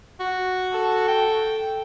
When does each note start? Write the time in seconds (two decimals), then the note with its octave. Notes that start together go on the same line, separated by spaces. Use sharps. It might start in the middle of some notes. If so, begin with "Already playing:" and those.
0.20 F#4
0.72 A4
1.08 G5